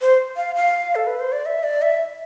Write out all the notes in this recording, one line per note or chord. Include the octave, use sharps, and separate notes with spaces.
C5
F5
F5
A4
B4
C5
D5
E5
D5
E5